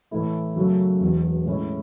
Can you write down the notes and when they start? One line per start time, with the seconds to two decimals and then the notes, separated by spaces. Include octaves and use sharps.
0.11 A2 E3 A3 E4
0.56 F#2 C#3 F#3 A3
1.00 E1 E2 B2
1.46 A2 G#3 C#4 E4